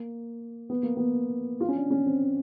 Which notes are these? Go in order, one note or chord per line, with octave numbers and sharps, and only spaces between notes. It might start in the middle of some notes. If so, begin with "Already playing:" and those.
Already playing: A#3
B3
A#3
B3
F4
C#4
D4
C#4
C4